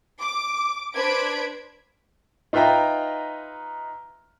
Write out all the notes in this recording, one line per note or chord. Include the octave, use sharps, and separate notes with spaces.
D6
D4 B4 C5 G#6 B6 D7
D#4 F4 B4 E5 G5 A#5